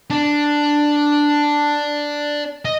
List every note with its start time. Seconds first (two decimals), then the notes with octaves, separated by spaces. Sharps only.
0.10 D4
2.65 D#5